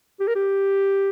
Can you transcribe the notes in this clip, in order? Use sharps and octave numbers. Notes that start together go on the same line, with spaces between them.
G4
A#4
G4